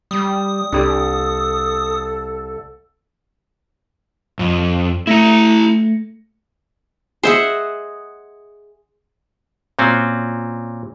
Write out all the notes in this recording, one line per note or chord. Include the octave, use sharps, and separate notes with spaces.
G3 D#6
C2 D4 G4 A4 D5
F2
A3 E4 A#5 A#6 C#7
G#4 C5 D#5 E5 F#5
A#2 C4 C#4 F#4